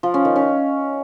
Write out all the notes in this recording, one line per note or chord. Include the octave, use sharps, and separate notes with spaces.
F3
C#4
D#3
C#4